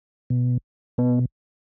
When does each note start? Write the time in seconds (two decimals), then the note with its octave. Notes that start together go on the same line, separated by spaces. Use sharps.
0.30 B2
0.98 B2 B3